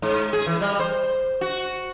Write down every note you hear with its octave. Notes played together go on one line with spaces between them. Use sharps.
G#2
G#4
E3
G3
C5
F#4